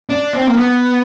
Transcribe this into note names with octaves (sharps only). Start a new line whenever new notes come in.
D4
C4
A#3
B3